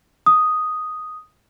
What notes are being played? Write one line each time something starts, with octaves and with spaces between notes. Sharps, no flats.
D#6